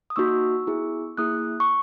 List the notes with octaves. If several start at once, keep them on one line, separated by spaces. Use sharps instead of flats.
D#6
A#3 D#4 F#4 C#6 E6
B3 E4 G#4
A#3 E4 G#4 D#6 F#6
C#6